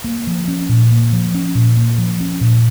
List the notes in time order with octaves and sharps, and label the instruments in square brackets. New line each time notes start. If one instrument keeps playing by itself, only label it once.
[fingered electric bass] A#3
F3
C#4
A#2
A#3
F3
C#4
A#2
A#3
F3
C#4
A#2